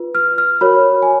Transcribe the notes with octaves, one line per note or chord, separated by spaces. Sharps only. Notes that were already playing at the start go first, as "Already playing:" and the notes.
Already playing: F4 B4
F6
F6
F#4 A#4 C#5 B5
G#5